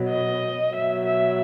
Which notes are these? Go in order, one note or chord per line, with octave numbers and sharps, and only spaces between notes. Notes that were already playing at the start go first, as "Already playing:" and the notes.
Already playing: B2 F#3
D#5
B2 F#3 E5
E5